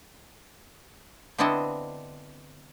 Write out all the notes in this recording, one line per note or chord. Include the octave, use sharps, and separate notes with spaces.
D3 B3 C4 D4 E4 D#5